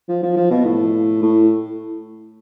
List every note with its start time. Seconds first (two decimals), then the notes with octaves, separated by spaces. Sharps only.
0.09 F3
0.23 F3
0.37 F3
0.51 B2
0.65 A2
1.22 A2